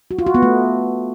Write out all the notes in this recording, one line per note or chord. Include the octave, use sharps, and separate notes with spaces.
F#4
F4
F#4
B3
A3